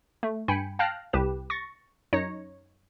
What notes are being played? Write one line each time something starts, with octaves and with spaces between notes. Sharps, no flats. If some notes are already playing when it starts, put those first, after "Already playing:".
A3
G2 G5 G#5 B5 C#7
F5 G5 A5 F6 F#6 A#6
C2 G4 B4 E7
C#6 A6 A#6
F#2 D#4 C#5 A#6 C#7